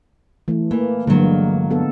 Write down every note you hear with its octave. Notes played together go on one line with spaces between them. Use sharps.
E3 A3
E3 A#3
G2 D3 F#3 G#3 A#3
B3 A4